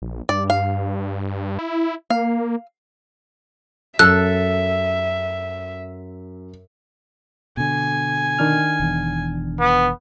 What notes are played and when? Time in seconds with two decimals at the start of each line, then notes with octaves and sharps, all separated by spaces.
0.02 A#1
0.29 G2 D5
0.50 F5
1.59 E4
2.10 A#3 F5
3.99 F#2 A4 E5 F#6
7.57 B2 D3 G#5
8.39 D#3 D4 F6
8.80 E1 E2
9.60 B3